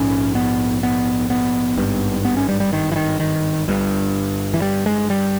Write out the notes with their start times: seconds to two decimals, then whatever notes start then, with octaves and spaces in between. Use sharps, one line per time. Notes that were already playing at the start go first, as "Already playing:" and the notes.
Already playing: A#1 G#2 C#4
0.35 B3
0.83 B3
1.30 B3
1.77 G#1 G2
2.25 B3
2.37 C#4
2.49 G3
2.60 G3
2.73 D#3
2.92 E3
2.96 D#3
3.20 D#3
3.68 G1 G2
4.54 E3
4.62 G3
4.86 G#3
5.10 G3